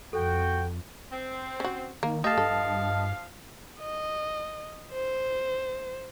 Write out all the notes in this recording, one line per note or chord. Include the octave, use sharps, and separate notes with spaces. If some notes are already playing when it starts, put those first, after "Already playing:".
F2 F#4 A4 G5
C4
C#4 F#4
D#3 A#3
F3 A3 G4 D#5 F5 A5
G2 A4
D#5
C5